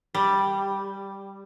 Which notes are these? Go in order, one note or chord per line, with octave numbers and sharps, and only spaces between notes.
G3